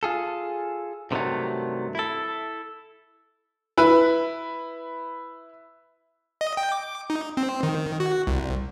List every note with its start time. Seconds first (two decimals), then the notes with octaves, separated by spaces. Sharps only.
0.03 F4 G#4 A4
1.11 G2 C3 D#3 E3 F#3 A3
1.95 E4 A4
3.77 E4 B4
6.41 D#5
6.57 G5
6.72 D6
7.10 D#4
7.37 C4
7.63 D#3
8.00 F#4
8.27 C2